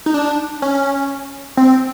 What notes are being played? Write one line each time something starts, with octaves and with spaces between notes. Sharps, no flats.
D#4
D4
C#4
C4